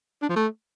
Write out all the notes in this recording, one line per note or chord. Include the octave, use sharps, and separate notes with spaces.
D4
F3
A3